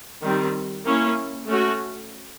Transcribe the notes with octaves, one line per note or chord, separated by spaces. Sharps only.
D#3 G3 C4
A#3 C#4 E4
A3 C#4 F#4